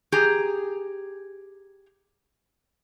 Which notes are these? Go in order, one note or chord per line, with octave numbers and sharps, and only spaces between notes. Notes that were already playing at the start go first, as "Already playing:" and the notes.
G4 G#4 A#5